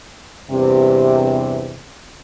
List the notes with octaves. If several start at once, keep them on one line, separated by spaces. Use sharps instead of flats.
E2 G2 C3